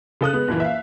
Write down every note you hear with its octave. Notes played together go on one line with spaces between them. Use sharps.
C#3 A4 D#6 F#6
G#3 B3
F#1 A#2 E3
E5 F5